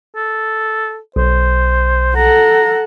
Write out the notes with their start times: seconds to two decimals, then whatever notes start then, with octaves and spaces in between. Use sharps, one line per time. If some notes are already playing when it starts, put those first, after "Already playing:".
0.16 A4
1.16 B1 C5
2.16 A4 F#5 A#5